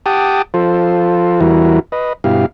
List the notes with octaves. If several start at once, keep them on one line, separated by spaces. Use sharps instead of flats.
G4 F#5 G5 A5 D6 D#6
F3 F4 A4 C5
E2 E3 G3 E4 F#4 A#4
B4 D#5
G2 B2 E4 G4 F5